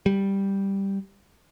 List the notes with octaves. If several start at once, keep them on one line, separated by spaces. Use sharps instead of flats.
G3